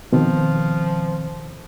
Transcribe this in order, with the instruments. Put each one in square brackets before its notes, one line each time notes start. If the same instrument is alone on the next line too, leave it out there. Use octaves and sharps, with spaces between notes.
[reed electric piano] B2 D#3 C4 [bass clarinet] F3